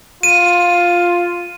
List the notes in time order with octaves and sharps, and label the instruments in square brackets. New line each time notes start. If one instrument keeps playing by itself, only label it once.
[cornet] F4 [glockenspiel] D#7